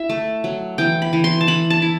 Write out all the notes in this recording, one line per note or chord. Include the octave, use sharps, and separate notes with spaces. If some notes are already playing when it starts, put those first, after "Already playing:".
Already playing: E4 E5
A3
F#3
E3 G5
B5
E3
C6
A5
E3 B5
A5
E4